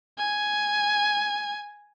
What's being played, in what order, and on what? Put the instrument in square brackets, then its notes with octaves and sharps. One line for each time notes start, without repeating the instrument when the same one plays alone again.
[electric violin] G#5